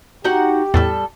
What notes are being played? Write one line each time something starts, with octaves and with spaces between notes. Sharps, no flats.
D#4 F#4 G4 F#5
E2 A2 G3 A4